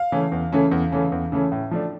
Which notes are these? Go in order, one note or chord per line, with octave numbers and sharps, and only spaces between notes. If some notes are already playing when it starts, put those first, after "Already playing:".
Already playing: F5
C#3 E3 A3 C#4
E2
C#3 E3 A3 C#4
E2
C#3 E3 A3 C#4
E2
C#3 E3 A3 C#4
A2
F3 A3 D4